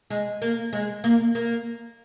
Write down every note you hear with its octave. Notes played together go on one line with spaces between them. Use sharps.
G#3
A#3
G#3
A#3
A#3